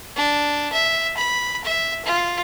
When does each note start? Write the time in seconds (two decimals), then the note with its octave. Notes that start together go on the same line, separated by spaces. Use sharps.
0.16 D4
0.72 E5
1.17 B5
1.64 E5
2.05 F4